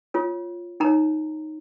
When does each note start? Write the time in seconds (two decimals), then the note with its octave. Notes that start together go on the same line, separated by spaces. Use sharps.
0.14 F4 C#5
0.80 D#4 C#5 A#5